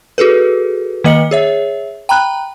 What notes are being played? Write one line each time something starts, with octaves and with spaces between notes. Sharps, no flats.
F#4 G#4 A4 B4
D#3 A#3 D#5 C#7 F#7
G#4 C#5 E5
G5 A#5 B5 F#6